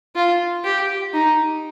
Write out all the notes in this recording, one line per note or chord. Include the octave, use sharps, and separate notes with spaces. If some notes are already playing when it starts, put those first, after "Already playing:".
F4
G4
D#4